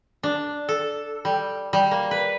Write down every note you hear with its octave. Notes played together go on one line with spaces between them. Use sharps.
D4
A4
G3
G3
A#3
B4